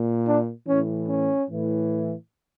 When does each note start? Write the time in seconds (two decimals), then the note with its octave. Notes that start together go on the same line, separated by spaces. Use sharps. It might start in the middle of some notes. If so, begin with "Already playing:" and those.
Already playing: A#2
0.26 D4
0.67 A2 E3 C#4
1.08 C#4
1.49 A2 E3